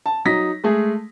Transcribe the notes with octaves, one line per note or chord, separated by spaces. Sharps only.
A5
F#3 D#4 A#6 B6
G#3 A3 G#4